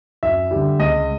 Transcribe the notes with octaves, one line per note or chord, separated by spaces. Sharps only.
F#2 E5
D3 G3
C#2 D#5